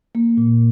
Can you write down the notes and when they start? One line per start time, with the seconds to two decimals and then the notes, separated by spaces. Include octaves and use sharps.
0.15 A#3
0.37 A#2